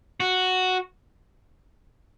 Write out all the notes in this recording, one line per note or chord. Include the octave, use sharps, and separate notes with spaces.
F#4